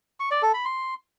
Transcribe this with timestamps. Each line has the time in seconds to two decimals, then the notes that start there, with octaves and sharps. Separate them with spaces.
0.20 C#6
0.31 D5
0.42 A4
0.54 B5
0.65 C6